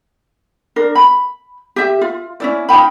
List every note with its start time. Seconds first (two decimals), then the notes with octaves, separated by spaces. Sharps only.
0.76 D4 A#4
0.95 B5
1.76 G4 E5
2.01 F4
2.40 C#4 E4 D5
2.69 D#4 F4 G5 B5